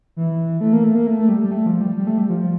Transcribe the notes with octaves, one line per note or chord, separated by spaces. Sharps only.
E3
A3
A#3
A3
A#3
A3
A3
G3
G3
A3
F3
G3
G3
A3
G3
F3
F3